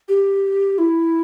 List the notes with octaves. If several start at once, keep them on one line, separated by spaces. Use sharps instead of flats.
G4
E4